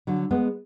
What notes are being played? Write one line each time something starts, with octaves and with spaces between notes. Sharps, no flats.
D3 F#3
G#3 B3